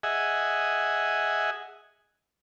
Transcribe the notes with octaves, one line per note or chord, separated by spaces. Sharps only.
G#4 D#5 E5 F#5 G#5